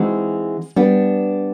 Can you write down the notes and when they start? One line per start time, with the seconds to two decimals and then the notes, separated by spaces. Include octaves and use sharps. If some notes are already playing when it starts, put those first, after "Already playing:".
Already playing: E3 G#3 C4 D#4 F#4
0.76 G3 B3 D4